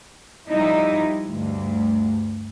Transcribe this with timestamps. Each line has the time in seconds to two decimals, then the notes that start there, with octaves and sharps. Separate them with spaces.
0.49 F3 G3 D#4 E4
1.27 D2 G2